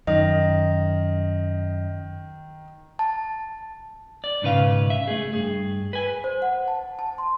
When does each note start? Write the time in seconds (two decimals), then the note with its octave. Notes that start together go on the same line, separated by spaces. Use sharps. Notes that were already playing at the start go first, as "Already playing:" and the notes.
0.07 F#2 D#3 D#5
2.99 A5
4.24 D5
4.42 B1 G#2 C#3 B4 F5
4.90 E5
5.08 A3 G#4
5.33 G2 G#4
5.93 B4 G#5
6.24 C5
6.42 F#5
6.68 A5
6.99 A5
7.18 C6